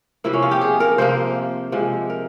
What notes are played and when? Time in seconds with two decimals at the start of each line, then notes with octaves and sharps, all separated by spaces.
0.24 C3 F3 A#3 E4
0.33 C#4
0.42 F4
0.51 G4
0.61 G#4
0.80 A#4
0.98 C3 F3 A#3 C5
1.72 C3 F3 G#3
2.10 A#4